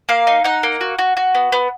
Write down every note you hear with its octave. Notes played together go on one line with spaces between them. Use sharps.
A#3 F5
D#4
D#4 F#5
A#3
F#4
F#4
F#4
B3
B3